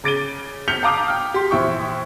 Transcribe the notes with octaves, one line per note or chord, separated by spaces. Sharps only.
C#3 D6 A6 D7 D#7 G7
F6 G6 B6 C#7 F7 G7
F5 A5 A#5 D6 D#6 G6
G5 F6
G4 C6
A#1 E3 E5 G5 C#6